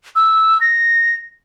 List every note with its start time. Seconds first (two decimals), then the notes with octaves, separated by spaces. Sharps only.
0.16 E6
0.61 A#6